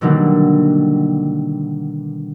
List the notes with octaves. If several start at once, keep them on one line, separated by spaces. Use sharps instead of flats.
B2 D3 D#3 F#3 G3 A#3